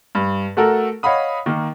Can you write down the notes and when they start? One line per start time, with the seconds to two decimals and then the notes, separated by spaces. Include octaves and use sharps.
0.15 G2
0.57 A3 F#4 A4 A#4
1.03 C#5 D#5 F5 F#5 B5 D#6
1.46 D#3 A#3